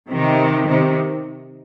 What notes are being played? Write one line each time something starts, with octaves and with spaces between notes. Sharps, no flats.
C3 D#3
C3 D#3